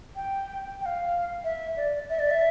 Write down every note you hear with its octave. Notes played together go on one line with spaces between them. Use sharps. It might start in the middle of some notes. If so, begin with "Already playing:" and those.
G5
G5
F5
E5
D5
E5
D5
E5